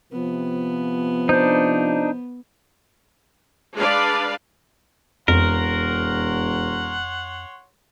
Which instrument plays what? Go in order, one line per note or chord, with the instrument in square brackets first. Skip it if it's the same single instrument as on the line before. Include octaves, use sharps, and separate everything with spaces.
[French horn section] C3 F3 [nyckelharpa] B3
[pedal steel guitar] D4 D#4 [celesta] C5 G6
[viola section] G#3 D4 B4 D5 F5
[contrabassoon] E1 [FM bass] F2 [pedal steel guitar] A#4 [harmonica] C#5 F#5 C6